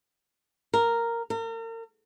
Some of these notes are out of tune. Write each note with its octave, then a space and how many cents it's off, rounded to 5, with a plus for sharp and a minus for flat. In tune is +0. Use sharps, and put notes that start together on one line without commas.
A#4 -5
A#4 -40